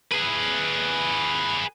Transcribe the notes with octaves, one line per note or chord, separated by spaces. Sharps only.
G#4 B4